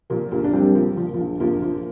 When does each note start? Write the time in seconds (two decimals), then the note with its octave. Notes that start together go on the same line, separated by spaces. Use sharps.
0.10 A#2 F3 A#3
0.32 A#1 F3 A#3
0.44 D4
0.53 A#1 G3 C4
0.75 F3 A#3
0.97 A#2 F3
1.14 A#1 F3
1.40 A#1 F3 A#3
1.62 F3